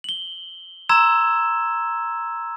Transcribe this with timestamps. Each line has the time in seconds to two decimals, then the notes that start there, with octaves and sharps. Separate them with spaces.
0.04 F#7 G7
0.89 A#5 C6 E6 G#6 E7